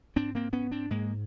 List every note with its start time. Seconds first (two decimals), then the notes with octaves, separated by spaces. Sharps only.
0.16 G#2 C4 D4
0.35 A#3 C4
0.53 B3 C#4
0.71 C4 D4
0.90 G#2 G#3 A#3